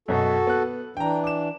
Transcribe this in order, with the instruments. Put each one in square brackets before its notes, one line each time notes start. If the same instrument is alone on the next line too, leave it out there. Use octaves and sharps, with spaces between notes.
[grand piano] F#2 B2 D#5 [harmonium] F#4 A4
[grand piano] B3 F#6
[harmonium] E3 D4 [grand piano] G5 A#5
[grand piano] D6 E7